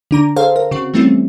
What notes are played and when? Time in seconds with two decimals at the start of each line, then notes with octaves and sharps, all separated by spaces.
0.11 D3 D4 A#5
0.36 G#4 A4 C5 F5
0.56 A#4
0.71 C#3 C4 F#4
0.94 E3 G3 A3 C4 C#4 E4